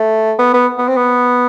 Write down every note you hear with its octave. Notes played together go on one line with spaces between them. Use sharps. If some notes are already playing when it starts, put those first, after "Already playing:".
Already playing: A3
B3
B3
B3
C4
B3